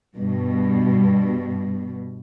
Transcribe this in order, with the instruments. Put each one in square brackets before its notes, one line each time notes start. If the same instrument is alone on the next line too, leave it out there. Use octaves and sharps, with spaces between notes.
[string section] G2 B2